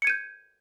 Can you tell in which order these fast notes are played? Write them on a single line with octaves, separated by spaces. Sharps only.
C#7 G#6 D#7 G6